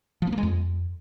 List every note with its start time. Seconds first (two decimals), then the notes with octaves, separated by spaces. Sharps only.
0.22 F3
0.27 B3
0.32 A#3
0.38 G#3
0.43 F2